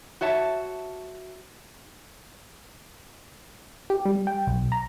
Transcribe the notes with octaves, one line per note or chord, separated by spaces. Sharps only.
F#4 C#5 E5 A5
G4
G3
G5
B1
A#5